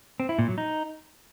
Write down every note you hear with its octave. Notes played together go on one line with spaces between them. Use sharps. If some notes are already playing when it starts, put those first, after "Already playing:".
C4
E4
A#2
F#3
D#4